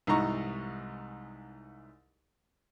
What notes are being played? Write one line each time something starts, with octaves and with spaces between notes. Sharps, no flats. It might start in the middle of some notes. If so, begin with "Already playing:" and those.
C2 G#2 E3 D#4 A#5 C#6